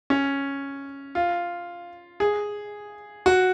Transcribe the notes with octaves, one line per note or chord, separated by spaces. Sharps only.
C#4
F4
G#4
F#4